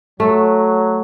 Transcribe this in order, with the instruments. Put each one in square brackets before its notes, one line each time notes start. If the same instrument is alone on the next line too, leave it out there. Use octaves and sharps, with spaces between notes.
[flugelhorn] F#3 [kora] A3